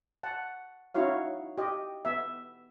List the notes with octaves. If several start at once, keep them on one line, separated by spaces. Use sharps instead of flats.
F#5 A5
C#4 D#4 E4 F#4 C#5 F5
G4 D#5
B3 E5